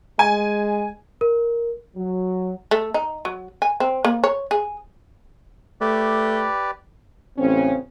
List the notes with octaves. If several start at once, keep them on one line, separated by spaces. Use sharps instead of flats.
G#3 G#5
A#4
F#3
A3
D#4
F#3
G#5
C4
A#3
C#5
G#4
A3 G4 B4 D5
A1 C#3 C4 C#4